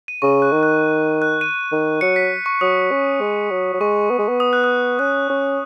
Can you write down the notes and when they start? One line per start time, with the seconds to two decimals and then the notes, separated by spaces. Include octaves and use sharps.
0.08 D#7
0.22 C#3 C#6
0.42 F#6
0.52 D#3
0.63 F#6
1.22 F#6
1.41 D#7
1.72 D#3
2.01 F#3 C#7
2.16 B6
2.46 C#6
2.61 F#3 D#6
2.91 C#4
3.21 G#3
3.51 F#3
3.74 F#3
3.80 G#3 C#6
4.10 B3
4.19 G#3
4.28 B3
4.40 D#6
4.53 F#6
4.64 D#6
4.99 C#4 F#6
5.29 C#4